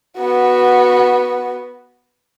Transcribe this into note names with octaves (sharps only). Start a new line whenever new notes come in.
B3 F#4